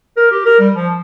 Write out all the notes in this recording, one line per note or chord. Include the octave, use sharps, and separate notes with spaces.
A#4
G4
A#4
G3
F3